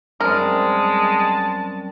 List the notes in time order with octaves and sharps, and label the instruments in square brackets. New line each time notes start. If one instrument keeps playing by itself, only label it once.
[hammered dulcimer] F#2 C3 G3 [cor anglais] G#3 [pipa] A#4 [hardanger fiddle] A5